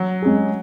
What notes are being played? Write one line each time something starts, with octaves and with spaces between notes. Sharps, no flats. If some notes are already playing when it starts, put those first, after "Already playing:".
Already playing: F#3
G#3 C#4 G#4